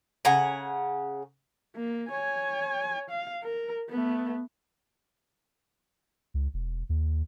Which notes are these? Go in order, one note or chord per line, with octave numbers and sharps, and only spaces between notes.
C#3 F#5 G#5 A#5
A#3
C#5 G#5
F5
A#4
A3 B3
C#2
E1
D#2